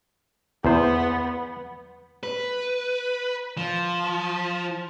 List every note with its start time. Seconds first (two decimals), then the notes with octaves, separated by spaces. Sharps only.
0.65 E2 B3 C5
2.23 B4
3.58 F3